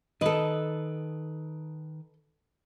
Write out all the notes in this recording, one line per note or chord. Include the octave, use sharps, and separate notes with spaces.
D#3 A4 B4 D#5